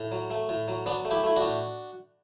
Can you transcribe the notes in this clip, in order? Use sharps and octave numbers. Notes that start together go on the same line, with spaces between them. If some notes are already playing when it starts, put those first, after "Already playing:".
Already playing: A2
F#3
A3
A2
F#3
F#3 B3 D4
A3
E4 G4
A3 E4
D4 F#4
A2